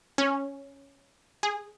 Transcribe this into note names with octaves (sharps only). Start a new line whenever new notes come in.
C#4
G#4